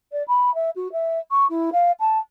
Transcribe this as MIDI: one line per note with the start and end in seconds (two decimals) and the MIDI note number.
0.12 0.23 74
0.28 0.53 83
0.54 0.70 76
0.76 0.91 66
0.92 1.19 76
1.31 1.46 85
1.50 1.70 64
1.73 1.91 77
2.00 2.18 81